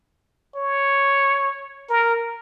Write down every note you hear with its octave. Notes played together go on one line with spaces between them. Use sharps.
C#5
A#4